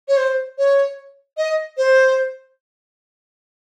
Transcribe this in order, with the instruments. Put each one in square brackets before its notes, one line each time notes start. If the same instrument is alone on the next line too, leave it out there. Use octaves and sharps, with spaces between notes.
[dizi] C#5
C5
C#5
D#5
C5